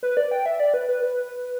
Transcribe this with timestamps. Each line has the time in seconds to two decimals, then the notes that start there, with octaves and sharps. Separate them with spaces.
0.03 B4
0.17 D5
0.31 G5
0.46 E5
0.60 D5
0.74 B4
0.89 B4
1.03 B4